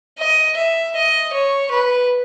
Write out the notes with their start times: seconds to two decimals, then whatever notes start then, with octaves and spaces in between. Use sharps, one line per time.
0.19 D#5
0.57 E5
0.96 D#5
1.33 C#5
1.71 B4